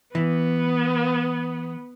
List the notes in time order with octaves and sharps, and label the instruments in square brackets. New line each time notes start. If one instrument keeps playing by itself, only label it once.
[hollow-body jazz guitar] E3 [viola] B3